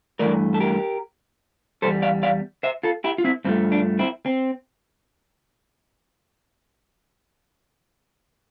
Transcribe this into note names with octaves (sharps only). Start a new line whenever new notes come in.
G2 E3 A3 A#4 D5
A4
G4 A#4
E2 C3 G3 A4 C5
D5 F5
D5 F5
C5 E5
F4 A4
E4 G4
F4
C4 E4
G2 F3 A3 C4
D4
C4 E4
C4